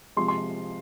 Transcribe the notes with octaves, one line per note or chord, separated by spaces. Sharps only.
C3 F3 G#3 C6
C6